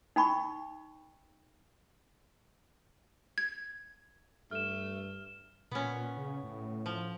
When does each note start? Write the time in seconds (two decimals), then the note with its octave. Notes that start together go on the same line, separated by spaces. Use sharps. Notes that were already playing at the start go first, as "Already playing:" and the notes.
0.16 D#4 G5 B5 C#6
3.38 G#6
4.51 G2 A3 F6 E7
5.71 A#2 B3 C#4
6.17 C#3
6.44 A2
6.86 F3